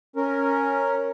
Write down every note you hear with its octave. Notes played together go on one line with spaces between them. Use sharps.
C#4 A#4